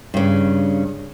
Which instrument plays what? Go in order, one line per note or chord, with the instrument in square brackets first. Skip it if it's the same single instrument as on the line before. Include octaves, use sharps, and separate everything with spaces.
[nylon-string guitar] G2 C#3